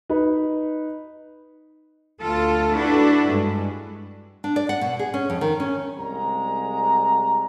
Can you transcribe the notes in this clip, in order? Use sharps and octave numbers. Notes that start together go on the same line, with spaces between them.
D#4 B4
D2 F4 A4
D4 E4 F#4 A4 B4
G2 G#3
D4
D5
F#5
B2
G#4
C#4
F2
D#3
C#4
C2 G#3 A#5